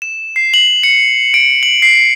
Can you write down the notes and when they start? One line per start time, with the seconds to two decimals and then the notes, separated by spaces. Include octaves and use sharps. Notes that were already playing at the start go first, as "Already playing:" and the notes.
0.02 E7
0.36 C7
0.54 F#7
0.83 C#7
1.34 D7
1.63 F#7
1.82 C7